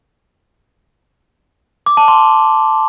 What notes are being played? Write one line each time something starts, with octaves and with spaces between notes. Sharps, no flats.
D6
A5
C6